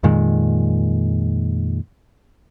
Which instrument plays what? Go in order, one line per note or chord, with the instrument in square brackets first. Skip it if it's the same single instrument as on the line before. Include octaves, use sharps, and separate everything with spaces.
[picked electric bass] F2 A#2 D#3 G#3